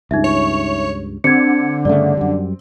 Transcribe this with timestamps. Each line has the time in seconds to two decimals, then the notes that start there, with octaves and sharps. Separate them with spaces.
0.11 C#2 G2 D#4 E5
0.24 C#5
1.24 D3 C4 G#6 C#7
1.85 G2 C#3 A3 D5
2.17 F#2 G3